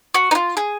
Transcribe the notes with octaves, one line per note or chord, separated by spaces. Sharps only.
F#4
D#4
F4
G#4